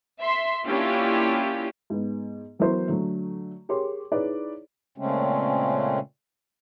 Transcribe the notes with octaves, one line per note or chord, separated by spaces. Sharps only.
E5 C6 B6
A#3 C#4 D4 E4 F4 G4
G#2 B3
E3 F#3 B3 E4 A#4 C5
D3 F#3 A3
G4 G#4 A#4 C#5 C6 D6
D#4 E4 G#4 B4 C#5 D5
A#2 C#3 G#3 A3 C4 C#4